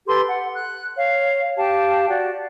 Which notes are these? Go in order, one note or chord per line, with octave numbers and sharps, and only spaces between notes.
G4 A4 B4 C6
F#5
F#6
C#5 F5
G4 F5 G5 A5
F#4 D5